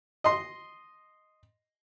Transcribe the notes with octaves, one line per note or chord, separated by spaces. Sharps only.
D#5 C6